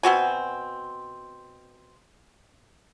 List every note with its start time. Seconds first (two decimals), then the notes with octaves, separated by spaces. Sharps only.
0.03 B2 C4 F#4 G#5